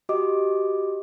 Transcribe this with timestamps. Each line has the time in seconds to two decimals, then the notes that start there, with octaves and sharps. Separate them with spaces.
0.09 F#4 G4 D#5 D6